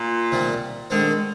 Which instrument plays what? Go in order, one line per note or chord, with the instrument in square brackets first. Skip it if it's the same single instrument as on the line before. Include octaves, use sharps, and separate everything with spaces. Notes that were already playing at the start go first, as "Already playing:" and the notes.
Already playing: [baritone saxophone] A#2
[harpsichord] C3 D#3 G3
[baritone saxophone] D3 [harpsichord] D#3 G#3 C4